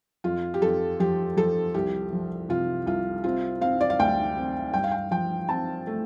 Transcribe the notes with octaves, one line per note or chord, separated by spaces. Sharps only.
F2 F4
G4
F2 A4
F3 G4
F3 A4
C2 G4
F3
C3 F4
C2 F4
C4 F4
C4 F5
D5
F5
D2 G5
C4
G2 G5
F5
G5
F3 G5
C4 A5
A3